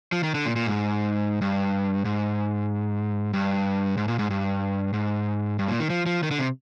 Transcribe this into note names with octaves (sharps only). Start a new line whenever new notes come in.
F3
D#3
D3
A#2
A#2
G#2
G2
G#2
G2
G#2
A#2
G#2
G2
G#2
G2
A#2
D#3
F3
F3
D#3
D3
C3